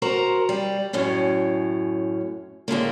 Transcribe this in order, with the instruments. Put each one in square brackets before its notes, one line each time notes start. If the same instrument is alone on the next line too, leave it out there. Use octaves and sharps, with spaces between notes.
[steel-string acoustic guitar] F#4 A#4 C5 A#5
G3
F#2 A2 C#4
A2 D3 G#3 A#3